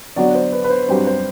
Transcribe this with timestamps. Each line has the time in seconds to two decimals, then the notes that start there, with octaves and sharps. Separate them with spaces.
0.16 D3 F#3 B3 F#4 D5
0.35 C5
0.52 B4
0.64 B4
0.70 C5
0.89 G2 F#3 C4 G4 C5
1.07 C5